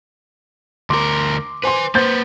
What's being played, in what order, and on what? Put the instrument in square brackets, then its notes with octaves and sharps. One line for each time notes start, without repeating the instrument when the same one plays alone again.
[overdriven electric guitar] D2 A#4 [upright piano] C6 D6
[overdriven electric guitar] B4 G#5 [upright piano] C5 C6
[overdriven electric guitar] A#3 B4 [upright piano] C5 G6 A6